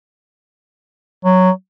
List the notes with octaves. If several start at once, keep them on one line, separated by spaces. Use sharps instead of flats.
F#3